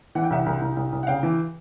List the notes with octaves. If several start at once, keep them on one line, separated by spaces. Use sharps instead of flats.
E3 F#5
G5
C2 E5 F#5
C2
C2
C2
C2
F#5
C#3 F5 G5
E3